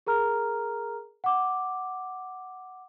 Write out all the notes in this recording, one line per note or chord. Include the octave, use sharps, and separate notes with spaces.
G#4 A#4 A#5 F6
F#5 D6